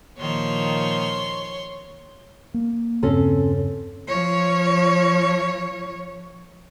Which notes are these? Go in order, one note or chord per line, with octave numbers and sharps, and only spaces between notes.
A#2 D#3 F3 C#5 C6
A#3
E2 G2 C#3 C4 C#4 A4
F3 C#5